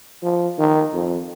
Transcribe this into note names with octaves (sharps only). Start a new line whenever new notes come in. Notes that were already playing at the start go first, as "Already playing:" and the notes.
F3
D#3
F2